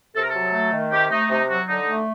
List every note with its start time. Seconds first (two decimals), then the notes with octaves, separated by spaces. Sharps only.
0.16 C3 A4
0.22 A#4
0.29 A4
0.35 F#3
0.53 A3
0.73 D#3
0.92 C3 G4
1.11 A3 D#4
1.30 C3 D#4
1.49 F#3 F#4
1.68 D3 D#4
1.87 A3